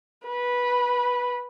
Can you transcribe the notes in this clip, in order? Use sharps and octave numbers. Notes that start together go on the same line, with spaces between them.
B4